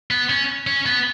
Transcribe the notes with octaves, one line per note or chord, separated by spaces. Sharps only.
B3
C#4
C#4
B3